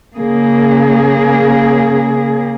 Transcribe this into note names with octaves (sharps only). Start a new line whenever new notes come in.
C#3 A#3 G#4